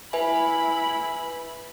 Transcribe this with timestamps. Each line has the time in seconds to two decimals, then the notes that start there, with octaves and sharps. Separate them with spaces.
0.13 E4 B4 E5 G#5 B5